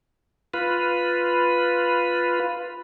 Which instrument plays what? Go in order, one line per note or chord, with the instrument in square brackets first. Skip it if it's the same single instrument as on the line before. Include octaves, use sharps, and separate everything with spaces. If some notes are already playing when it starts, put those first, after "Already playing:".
[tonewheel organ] F4 B4